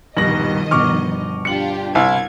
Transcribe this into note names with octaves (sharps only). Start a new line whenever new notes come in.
D#1 G2 B2 D#3 F3 D#5 A#6 F#7
G1 B2 C#6 D6 F6
D4 F4 G4 C#7 F#7
C2 E4 G#6